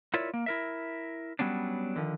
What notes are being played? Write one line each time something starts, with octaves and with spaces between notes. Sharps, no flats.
E4 F4 A#4 C#5 D5 E5
A#3
E4 A#4 E5
F#3 G3 B3 C#4 D4
D3 D#3 F3